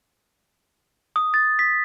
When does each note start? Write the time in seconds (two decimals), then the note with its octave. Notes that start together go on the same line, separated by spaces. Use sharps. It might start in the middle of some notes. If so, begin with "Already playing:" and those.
1.16 D#6
1.34 A6
1.59 B6